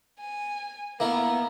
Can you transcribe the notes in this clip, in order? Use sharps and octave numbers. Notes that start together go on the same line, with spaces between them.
G#5
A#3 B3 E4 A#4